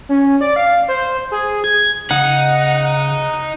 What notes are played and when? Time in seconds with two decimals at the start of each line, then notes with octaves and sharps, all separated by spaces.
0.09 C#4
0.41 D5
0.56 F5
0.88 C5
1.31 G#4
1.64 G#6
2.11 C#3 D#4 F#5